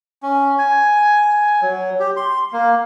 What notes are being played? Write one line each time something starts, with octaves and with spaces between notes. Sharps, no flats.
C#4
G#5
F#3
G4
C6
A#3